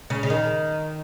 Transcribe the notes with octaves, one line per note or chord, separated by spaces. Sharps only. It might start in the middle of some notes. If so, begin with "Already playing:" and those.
C#3
C#3
D#3